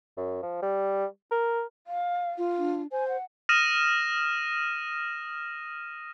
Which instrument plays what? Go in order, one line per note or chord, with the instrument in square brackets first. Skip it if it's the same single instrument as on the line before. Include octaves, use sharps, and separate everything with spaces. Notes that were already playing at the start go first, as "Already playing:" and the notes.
[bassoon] F#2
F3
G3
A#4
[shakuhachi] F5
[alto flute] F4
[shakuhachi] D4
[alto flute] C5 [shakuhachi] G#5
[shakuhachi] F#5
[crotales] D#6 F6 A#6 D#7 E7